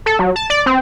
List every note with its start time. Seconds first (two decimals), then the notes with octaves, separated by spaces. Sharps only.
0.06 A4
0.19 F#3
0.36 A5
0.50 D5
0.66 C4